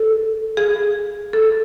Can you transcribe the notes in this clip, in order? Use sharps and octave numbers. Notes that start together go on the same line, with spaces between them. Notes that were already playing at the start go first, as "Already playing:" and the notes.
Already playing: A4
G#4
A4